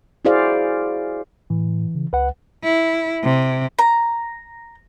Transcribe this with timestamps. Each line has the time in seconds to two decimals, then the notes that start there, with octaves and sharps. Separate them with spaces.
0.25 E4 F#4 G#4 C5 D5 F5
1.50 A2 E3
1.95 C#3
2.13 C#2 B4 F#5
2.64 E4
3.24 C3
3.79 A#5